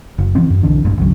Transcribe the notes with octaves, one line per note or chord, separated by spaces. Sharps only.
F#1
E3 F3 C4
F#2
B1 D3 E3 D4
G1 G2 A#2
F#1 C2 D3 F#3